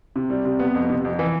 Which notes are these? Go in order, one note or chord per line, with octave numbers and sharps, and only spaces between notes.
C3
G3
C3
B3
F2
C3
F2
E3